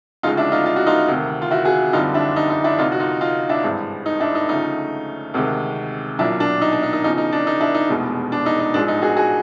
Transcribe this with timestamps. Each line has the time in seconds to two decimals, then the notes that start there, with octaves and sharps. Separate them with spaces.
0.23 D2 C#3 F3 G#3 D#4 F4
0.37 D4 E4
0.52 D#4 F4
0.66 F4
0.76 F#4
0.86 D#4 F4
1.08 D2 C3 D#3
1.42 F4
1.51 E4 F#4
1.65 F#4 G#4
1.93 F#1 F2 D3 G3 D#4 F4
2.14 D4 E4
2.36 D#4
2.50 D#4
2.64 D4 E4
2.78 D2 C3 F3 D#4 F4
2.92 F#4
3.00 D#4 F4
3.21 D#4 F4
3.49 D4 E4
3.64 G#1 G2 E3 G#3
4.06 D#4
4.20 D4 E4
4.35 D#4
4.49 D2 C#3 F3 A3 D#4
5.34 D2 C3 D#3 G#3
6.19 B1 A#2 F#3 D4 E4
6.40 D4
6.61 D#4
6.72 D4
6.83 D#4
6.93 D#4
7.04 E2 C#3 F3 D#4
7.18 D#4
7.32 D4
7.47 D#4
7.61 D4 E4
7.74 D#4
7.89 F1 E2 B2 G#3
8.32 D4
8.46 D#4
8.60 D#4
8.74 A1 G#2 F3 G#3 D4
8.88 D#4
9.02 F#4 G#4
9.17 F#4 G#4